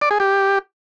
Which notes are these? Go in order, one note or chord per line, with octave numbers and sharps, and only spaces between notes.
D5
G#4
G4